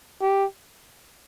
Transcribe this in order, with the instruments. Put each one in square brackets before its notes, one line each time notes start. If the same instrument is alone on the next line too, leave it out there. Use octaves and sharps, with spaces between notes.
[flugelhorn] G4